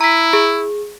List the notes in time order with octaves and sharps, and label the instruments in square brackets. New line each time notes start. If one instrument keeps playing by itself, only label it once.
[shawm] E4 [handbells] A#5 B6
[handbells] G#4